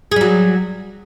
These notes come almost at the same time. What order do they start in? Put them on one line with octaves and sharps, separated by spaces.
G#4 G3 F#3